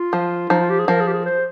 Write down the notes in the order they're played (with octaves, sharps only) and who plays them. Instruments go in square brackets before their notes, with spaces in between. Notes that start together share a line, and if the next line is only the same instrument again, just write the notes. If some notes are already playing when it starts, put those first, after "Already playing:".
Already playing: [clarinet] F4
[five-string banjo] F3
[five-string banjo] F3 [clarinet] D#4
[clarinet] F4
G4
G#4
[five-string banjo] F3 [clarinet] A#4
[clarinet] G#4
G4
G#4
C5